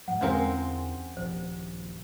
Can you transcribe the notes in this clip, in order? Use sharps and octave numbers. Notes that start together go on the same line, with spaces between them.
G#2 F3 G3 F#5
E2 D3 G#3 C4 C#4 A#4 F5 G#5
D#1 F3 C5